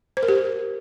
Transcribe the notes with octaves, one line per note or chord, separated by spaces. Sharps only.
C5
A#4
G4